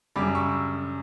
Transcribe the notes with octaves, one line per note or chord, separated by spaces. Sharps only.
F#2 C#3 G3 B5 D6
C#6 E6